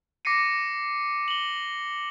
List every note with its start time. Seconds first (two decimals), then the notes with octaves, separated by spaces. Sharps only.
0.25 D6 A#6 C7 C#7 D#7
1.28 F#7 G7